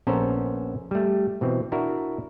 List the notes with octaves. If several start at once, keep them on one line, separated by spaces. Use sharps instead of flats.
A#1 B3 C#4 A4 C5 A#5
G3 A3
B2 E3 C4
D4 E4 F#4 A#4